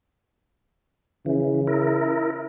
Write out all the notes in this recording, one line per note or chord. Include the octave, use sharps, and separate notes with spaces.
C#3 E3
E4 A#4